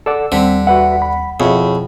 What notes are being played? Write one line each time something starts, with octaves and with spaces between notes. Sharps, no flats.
A4 D5 F#5 E6
D#2 D3 G3 C4 B6
F#4 B4 E5 F#5
B5
F2 B2 E4 F#4 G#4 C#5 B5